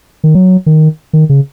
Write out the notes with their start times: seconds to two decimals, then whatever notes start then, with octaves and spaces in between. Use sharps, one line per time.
0.24 D#3
0.35 F#3
0.66 D#3
1.13 D#3
1.29 C#3